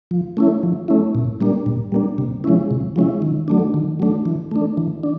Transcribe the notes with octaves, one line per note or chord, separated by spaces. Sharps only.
F3
A3 C#4 E4
F3
A3 C#4 E4
A#2
G3 A#3 D4
A#2
G3 A#3 D4
C3
F3 G#3 C#4 E4
C3
F3 G#3 C#4 E4
D#3
F#3 A3 D4
D#3
F#3 A3 D4
E3
A3 D4
E3
D4